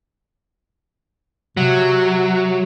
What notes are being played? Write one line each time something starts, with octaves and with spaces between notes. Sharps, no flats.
C3 F#3